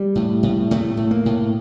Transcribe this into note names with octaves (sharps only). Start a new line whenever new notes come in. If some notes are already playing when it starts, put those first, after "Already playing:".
Already playing: G3
A2
A2
A2 A3
A2
A#3
A2